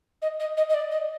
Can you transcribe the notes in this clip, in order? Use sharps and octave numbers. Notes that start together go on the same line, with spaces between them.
D#5
D#5
D#5
D#5
D5
D#5